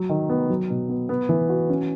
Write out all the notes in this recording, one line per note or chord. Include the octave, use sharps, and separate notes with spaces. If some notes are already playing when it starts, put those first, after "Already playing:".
Already playing: F#3
D#3
B3
F#3
B2
B3
B3
E3
F#4
C#4